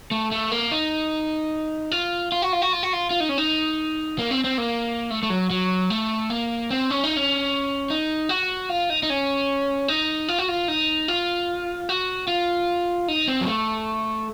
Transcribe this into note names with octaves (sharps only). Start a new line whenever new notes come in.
A3
A3
A#3
D#4
F4
F4
F#4
F4
F#4
F4
F#4
F4
F4
D#4
C#4
D#4
A#3
C4
C4
A#3
A3
A3
F#3
F#3
A3
A#3
C4
C#4
D#4
C#4
D#4
F#4
F4
D#4
D#4
C#4
D#4
F4
F#4
F4
D#4
F4
F#4
F4
D#4
C4
F#3
A3